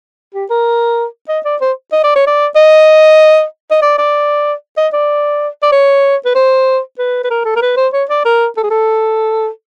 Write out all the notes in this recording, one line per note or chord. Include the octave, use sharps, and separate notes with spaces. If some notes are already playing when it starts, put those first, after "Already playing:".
G4
A#4
D#5
D5
C5
D#5
D5
C#5
D5
D#5
D#5
D5
D5
D#5
D5
D5
C#5
B4
C5
B4
B4
A#4
A4
A#4
B4
C5
C#5
D5
A#4
A4
G#4
A4